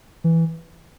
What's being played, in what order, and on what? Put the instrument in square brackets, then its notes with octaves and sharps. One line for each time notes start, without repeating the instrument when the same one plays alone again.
[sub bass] E3